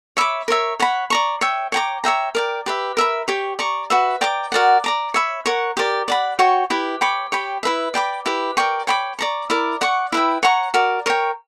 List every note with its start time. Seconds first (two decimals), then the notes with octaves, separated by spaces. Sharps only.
0.17 C#5 E5 B5 D6
0.48 A#4 C#5 E5
0.80 C#5 F#5 B5
1.10 D5 A#5 C#6
1.41 C#5 E5 G5
1.72 C#5 G5 A#5 D6
2.04 C#5 E5 G5 A#5
2.35 A#4 D5 G5
2.66 G4 B4 E5
2.97 A#4 E5 B5
3.28 G4 C#5 G5
3.59 D5 A#5 C#6
3.90 F#4 B4 E5
4.21 D5 G5 A#5 D6
4.52 F#4 A#4 D5 F#5
4.84 D5 A#5 D6
5.14 C#5 E5 B5
5.46 A#4 C#5 F#5
5.77 G4 A#4 D5
6.08 D5 F#5 B5
6.39 F#4 C#5 G5 C#6
6.70 E4 G4 B4
7.01 C#5 G5 B5 D6
7.32 G4 C#5 G5 B5
7.63 E4 B4 E5
7.94 D5 G5 B5 D6
8.26 E4 G4 B4
8.57 A#4 D5 G5 C#6
8.87 C#5 G5 B5 D6
9.19 D5 A#5 C#6
9.50 E4 A#4 D5
9.81 D5 F#5 C#6
10.12 E4 B4 E5 G5
10.43 C#5 F#5 A#5 C#6
10.74 F#4 A#4 D5
11.06 A#4 C#5 G5